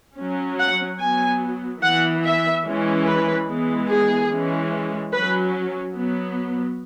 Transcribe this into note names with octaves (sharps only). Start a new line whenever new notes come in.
F#3 C#4
F#5
F#3 B3 G#5
E3 B3 F#5
E5
E3 G#3 C#4
B4
E3 G#3 B3
G#4
E3 G#3 C#4
F#3 C#4 B4
F#3 B3